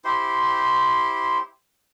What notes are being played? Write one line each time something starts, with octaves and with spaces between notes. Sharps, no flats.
E4 G4 C5 C6